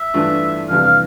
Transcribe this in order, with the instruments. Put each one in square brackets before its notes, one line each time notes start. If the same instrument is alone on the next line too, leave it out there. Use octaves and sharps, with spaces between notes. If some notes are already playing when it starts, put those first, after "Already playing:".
Already playing: [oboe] E5
[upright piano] G2 E3 A3 D4 F4
[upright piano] F2 C3 E3 G3 D4 [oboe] F5
[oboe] F5